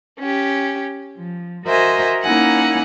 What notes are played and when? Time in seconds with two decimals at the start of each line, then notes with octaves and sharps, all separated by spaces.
0.20 C#4 G4
1.16 F3
1.66 F#4 A#4 C5 D#5 E5 G#5
2.24 A#3 C#4 D#4 E4 F#5 G#5